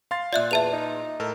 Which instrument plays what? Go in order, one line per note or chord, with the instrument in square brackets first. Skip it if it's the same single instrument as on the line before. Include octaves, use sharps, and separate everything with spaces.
[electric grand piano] F5 C6 A6
[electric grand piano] A#2 F4 [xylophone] D5 E5 F#6
[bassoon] E2 [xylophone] E5 A5 F7
[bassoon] D#4
[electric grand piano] A2 A4 A#4